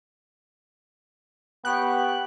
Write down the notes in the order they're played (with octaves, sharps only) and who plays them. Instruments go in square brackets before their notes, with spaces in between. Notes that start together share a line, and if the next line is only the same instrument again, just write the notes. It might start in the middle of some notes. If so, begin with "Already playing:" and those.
[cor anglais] B3 [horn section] G4 C#5 G5 [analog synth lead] F#6